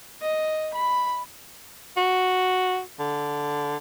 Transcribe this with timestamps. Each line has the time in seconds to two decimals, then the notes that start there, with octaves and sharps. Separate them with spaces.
0.22 D#5
0.74 B5
1.97 F#4
3.00 D3